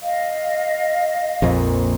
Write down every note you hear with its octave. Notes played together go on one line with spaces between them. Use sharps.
D#5 F5
A#1 F2 A#2